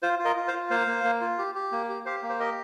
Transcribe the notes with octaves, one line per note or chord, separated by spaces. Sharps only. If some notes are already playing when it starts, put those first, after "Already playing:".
F4 C5
F4
A#4 D#5
F4
C5 F5
F4
A#3 C5 F5
A#3
A#3
F4
G4
G4
A#3
G4
G4 C5 F5
A#3
C5
G4 A#4 D#5